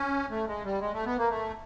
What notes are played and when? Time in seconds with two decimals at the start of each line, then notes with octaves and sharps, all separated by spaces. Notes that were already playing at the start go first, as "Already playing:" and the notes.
Already playing: C#4
0.30 A3
0.48 G#3
0.65 G3
0.81 G#3
0.94 A3
1.06 B3
1.18 A#3
1.30 A3